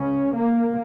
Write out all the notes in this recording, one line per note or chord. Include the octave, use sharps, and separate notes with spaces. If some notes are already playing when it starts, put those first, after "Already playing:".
Already playing: C#2 C#3 C#4
A#3